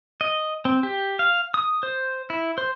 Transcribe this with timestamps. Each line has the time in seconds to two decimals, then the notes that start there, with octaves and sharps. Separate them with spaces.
0.21 D#5
0.65 C4
0.83 G4
1.19 F5
1.54 D#6
1.83 C5
2.30 E4
2.58 C5